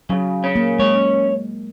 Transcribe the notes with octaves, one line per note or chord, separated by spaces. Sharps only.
C#3 F#3
C#4
A#3
G#3 C#5